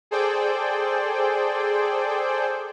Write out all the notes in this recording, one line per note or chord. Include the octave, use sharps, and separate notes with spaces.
G#4 A4 C5 D5 G5